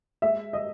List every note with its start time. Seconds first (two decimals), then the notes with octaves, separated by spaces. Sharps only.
0.22 G#3 E5
0.53 D#5